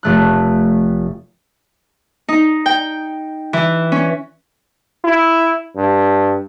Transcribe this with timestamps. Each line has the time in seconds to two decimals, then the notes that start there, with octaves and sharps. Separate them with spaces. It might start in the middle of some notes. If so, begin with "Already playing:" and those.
0.03 F1 A3 F#6
2.29 D#4
2.66 G5
3.53 E3
3.92 C#4
5.04 E4
5.76 G2